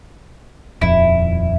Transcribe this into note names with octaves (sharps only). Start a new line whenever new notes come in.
D#1 F2 E4